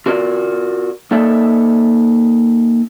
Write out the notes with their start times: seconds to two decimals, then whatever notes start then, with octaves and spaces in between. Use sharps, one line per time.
0.06 F4 F#4 A#4 D5
1.11 A#3 D#4 A4 D5 E5